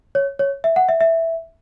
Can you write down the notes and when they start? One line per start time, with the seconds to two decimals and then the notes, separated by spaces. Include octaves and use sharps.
0.15 C#5
0.39 C#5
0.64 E5
0.76 F#5
0.89 E5
1.01 E5